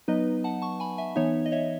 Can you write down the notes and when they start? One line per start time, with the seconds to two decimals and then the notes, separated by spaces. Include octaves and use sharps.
0.08 F#3 B3 D#4 B4 D#5
0.44 F#5 A5
0.62 A5 C#6
0.80 G#5 B5
0.98 E5 G#5
1.16 E3 B3 D#4 C#5 E5
1.46 D#5
1.52 C#5 E5